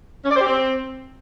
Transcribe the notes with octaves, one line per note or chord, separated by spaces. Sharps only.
C#4
D5
C5
G4
C4